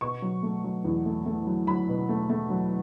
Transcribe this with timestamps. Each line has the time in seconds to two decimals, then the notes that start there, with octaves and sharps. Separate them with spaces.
0.01 B2 C#6
0.22 F#3
0.43 A3
0.64 F#3
0.85 E2
1.06 A3
1.26 A3
1.47 F#3
1.67 F#3 B5
1.88 B2
2.09 A3
2.29 A3
2.50 F#3